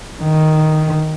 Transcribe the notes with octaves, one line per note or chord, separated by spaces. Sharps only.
D#3